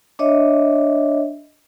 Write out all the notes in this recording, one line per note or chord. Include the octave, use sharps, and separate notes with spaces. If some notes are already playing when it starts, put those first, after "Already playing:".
D4 C#5 D#5 E5